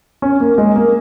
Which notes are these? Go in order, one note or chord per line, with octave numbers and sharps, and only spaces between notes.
C#4
A#3
G#3
A#3